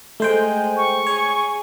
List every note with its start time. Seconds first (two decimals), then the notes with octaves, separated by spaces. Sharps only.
0.20 G#3 A3 C5 G5
0.77 C#6
1.07 G#4 C#5